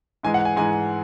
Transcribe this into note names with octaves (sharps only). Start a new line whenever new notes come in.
G#2 E3 G#3 G#5
F#5
G#5
G#2 E3 G#3 G#5